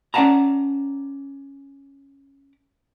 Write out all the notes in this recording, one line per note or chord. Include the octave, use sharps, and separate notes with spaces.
C#4 D5 F5 F#5 A5 A#5